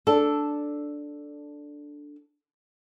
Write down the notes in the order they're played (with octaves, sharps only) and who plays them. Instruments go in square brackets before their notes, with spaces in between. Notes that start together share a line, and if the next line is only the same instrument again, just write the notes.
[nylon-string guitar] D4 A4